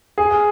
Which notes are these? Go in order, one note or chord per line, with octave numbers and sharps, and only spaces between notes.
G#4